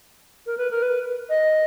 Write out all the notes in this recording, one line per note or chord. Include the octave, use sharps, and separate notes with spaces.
A#4
B4
A#4
B4
D#5